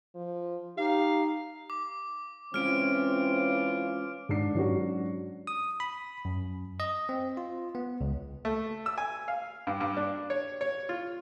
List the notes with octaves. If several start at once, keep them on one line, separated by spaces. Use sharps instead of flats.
F3
D#4 G4 F5
D6
E3 G#3 C4 C#4 F4 C#5 F6 D7
G#2 D4 C7
G#2 F#3 C#4 D4 F#4
D#6
B5
F#2
D#5
C4
F4
B3
C#2
A3
E6
G#5
F5
G2
G2
D4
C#5
C#5
F4